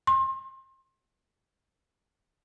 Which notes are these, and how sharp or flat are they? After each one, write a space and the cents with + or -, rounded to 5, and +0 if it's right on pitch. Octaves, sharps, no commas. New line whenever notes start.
C6 +30